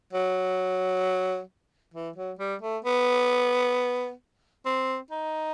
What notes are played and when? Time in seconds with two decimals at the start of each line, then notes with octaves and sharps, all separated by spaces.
0.13 F#3
1.94 E3
2.16 F#3
2.39 G3
2.62 A3
2.85 B3
4.66 C4
5.11 D#4